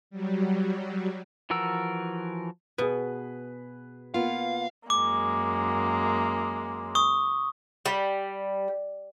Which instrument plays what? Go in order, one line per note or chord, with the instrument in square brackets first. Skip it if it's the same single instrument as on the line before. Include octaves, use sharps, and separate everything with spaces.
[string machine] F#3 G3
[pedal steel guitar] E3 F3 F#4 A#4 E6
[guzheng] B2 [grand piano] G#4 B4
[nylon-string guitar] A#3 B3 F4 [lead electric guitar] F5
[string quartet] F#2 G#3 A#3 [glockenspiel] D6
[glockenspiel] C#6 D#6
[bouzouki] G3